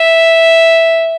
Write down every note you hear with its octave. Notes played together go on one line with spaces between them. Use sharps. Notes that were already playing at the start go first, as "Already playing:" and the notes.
Already playing: E5